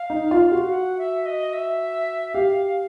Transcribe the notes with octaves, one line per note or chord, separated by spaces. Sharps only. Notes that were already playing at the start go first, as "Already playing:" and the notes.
Already playing: F5
D#4
F4
F#4
F#5
E5
D#5
E5
G4 F5